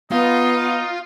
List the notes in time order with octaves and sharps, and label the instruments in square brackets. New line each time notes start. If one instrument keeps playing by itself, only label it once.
[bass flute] B3 [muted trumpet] D#4 [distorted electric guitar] F4